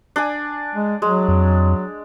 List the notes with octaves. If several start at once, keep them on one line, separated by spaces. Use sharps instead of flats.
D4 D5 G#5
G#3
F#3 G#3
F2